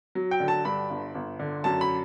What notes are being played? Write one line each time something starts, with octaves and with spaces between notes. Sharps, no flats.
F#3
G5
D3
A5
G2 B5
G1
G1
D3
F#2 A5
B5